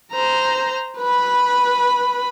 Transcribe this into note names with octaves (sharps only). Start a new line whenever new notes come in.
C5 A#5
B4 B5